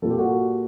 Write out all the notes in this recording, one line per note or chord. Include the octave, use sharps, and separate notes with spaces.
A#2 G3 A4
G4
F#4 A4